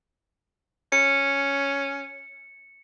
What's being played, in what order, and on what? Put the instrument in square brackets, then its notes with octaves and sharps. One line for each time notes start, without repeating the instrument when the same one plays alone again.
[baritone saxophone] C#4 [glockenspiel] C#7